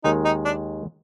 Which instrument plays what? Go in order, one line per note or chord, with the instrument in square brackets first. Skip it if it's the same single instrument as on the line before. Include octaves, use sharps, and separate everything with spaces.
[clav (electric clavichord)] D#2 D#3 G#3 [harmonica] D#4
[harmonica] D#4
D4